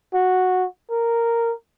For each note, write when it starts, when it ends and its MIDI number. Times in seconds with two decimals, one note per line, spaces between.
0.14 0.66 66
0.91 1.53 70